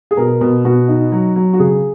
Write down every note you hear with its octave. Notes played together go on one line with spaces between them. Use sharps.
G#4
B2 A#4
B2
B2 F#4
D#4
F#3
F#3
F#4
C#3 G#4